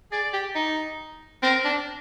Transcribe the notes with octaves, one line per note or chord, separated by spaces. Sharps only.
G#4 D5
G4
D#4
C4 A#4
D4